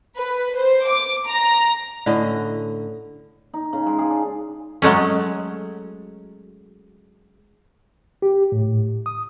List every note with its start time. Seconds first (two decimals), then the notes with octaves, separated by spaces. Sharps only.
0.18 B4
0.57 C5
0.88 D6
1.27 A#5
2.06 A2 D3 C#4 D#5
3.54 D#4
3.73 C#3
3.86 G#3
3.99 G#4
4.10 D4
4.82 F#3 G#3 A3 C#4
8.22 G4
8.52 A2
9.06 D#6